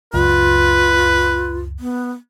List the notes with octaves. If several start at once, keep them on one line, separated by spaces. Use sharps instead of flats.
C#2 F#2 F4 B4
B3